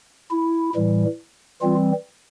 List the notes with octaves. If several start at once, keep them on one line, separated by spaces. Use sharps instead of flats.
E4
A2 E3 G3
E3 G3 C4 F4